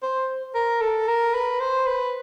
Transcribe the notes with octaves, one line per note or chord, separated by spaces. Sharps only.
C5
A#4
A4
A#4
B4
C5
B4